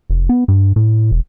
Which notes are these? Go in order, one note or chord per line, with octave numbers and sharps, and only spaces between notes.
F1
B3
G2
A2
E1